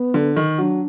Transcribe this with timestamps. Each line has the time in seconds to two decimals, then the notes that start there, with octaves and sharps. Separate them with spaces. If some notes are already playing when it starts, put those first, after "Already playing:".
Already playing: B3
0.14 D3
0.36 D#3
0.58 F#3 D4